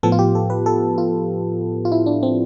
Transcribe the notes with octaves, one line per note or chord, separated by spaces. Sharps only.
A2 F3 B3 A4
F4
G4
A4
B4
A4
F4
F4
E4
D4
C4